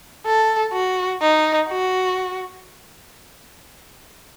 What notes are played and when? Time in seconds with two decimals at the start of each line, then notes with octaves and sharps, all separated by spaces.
0.26 A4
0.73 F#4
1.22 D#4
1.69 F#4